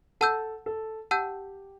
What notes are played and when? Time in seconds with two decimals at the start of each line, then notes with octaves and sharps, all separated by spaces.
0.21 A4 F#5 A5 E6 G6
0.66 A4
1.11 G4 F#5 A5 E6 G6